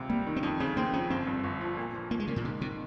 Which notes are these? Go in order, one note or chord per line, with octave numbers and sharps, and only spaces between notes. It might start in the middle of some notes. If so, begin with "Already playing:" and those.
Already playing: C#2 C3
G3 A#3
D#3
C4
F2 C#4
C#3 C4
A#3 C4
F3 C#4
G1 C4
G2
G1
F3
A#2
F3
A#2 A#3
G#3
C#3 A#3
A#2
G#2 C#3
C3 D#3